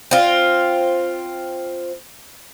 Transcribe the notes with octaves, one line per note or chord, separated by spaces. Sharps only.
C4 F4